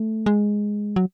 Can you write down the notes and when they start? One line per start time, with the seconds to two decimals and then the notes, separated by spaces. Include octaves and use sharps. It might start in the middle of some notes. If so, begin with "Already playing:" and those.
Already playing: A3
0.26 G#3
0.96 F#3